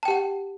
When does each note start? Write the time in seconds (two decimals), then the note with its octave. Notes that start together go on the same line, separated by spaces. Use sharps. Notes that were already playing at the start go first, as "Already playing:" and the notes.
0.03 A5
0.05 G5
0.08 G4
0.10 F#5